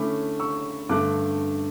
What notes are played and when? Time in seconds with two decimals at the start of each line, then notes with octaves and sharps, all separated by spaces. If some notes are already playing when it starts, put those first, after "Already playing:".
Already playing: D3 A3 C#4 E4 B5 D6
0.39 C#6 E6
0.89 G2 D3 A3 D6 F#6